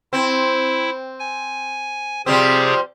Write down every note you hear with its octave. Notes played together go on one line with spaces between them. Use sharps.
C4 E4
G#5
C3 F3 G3 C4 G4 G#4